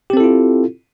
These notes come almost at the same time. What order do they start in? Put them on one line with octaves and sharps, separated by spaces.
G4 C4 A4 E4 F4